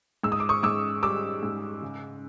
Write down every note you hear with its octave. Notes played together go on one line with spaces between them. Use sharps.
G#2 E6
D#6
D6
C#6 D#6
G#2 D6 E6
G3 D6 E6
G#2
C#3